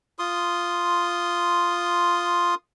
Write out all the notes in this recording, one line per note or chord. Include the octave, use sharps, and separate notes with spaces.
F4 C6 D#6